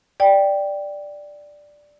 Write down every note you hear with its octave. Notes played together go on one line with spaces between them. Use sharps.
D5 G5